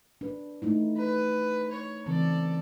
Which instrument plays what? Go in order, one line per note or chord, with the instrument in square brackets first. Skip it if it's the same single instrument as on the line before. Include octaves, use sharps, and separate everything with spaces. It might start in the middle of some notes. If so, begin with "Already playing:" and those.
[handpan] D4 B4
A3 D#4 E4
[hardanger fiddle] B4
C#5
[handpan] C#3 E3 C4 [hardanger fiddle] A4 D5